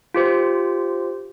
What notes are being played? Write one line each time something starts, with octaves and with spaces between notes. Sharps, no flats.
F4 G4 C5